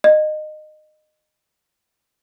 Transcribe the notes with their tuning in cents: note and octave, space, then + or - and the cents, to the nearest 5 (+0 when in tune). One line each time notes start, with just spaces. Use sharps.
D#5 -20